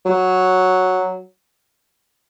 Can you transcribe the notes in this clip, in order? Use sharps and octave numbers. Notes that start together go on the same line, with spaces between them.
F#3